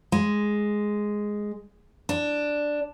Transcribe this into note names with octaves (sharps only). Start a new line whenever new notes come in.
G#3
D4